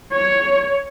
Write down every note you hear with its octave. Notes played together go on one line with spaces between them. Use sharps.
C#5